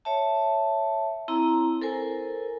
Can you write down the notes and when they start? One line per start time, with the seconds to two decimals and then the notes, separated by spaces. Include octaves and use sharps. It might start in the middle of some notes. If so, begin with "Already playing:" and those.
0.05 C#5 E5 A5
1.28 C4 E4 A#5
1.82 A4 A#4 C5 G#5